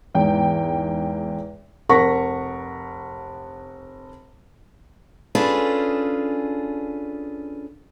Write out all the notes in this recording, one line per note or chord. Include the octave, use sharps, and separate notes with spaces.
E2 G#2 G5
F1 A#4 F#5 C#6 A#6 B6
C#4 D4 F4 G#4 A4 B4